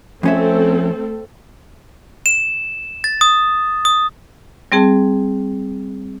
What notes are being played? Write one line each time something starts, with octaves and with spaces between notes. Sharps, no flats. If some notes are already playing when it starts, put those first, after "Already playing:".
F2 A3 C4 C#4 A4 E5
E7
A6
D#6
D#6
G3 C4 G#4 A5